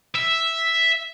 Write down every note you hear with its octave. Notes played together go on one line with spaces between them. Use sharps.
E5